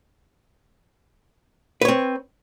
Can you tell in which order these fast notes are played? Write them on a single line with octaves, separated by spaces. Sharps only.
B4 C#5 C4